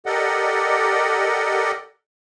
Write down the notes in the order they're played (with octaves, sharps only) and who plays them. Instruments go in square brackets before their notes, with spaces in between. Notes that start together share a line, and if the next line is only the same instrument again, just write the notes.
[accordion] G4 A4 A#4 D5 D#5 F#5